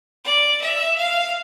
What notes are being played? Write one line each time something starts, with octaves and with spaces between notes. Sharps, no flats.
D5
E5
F5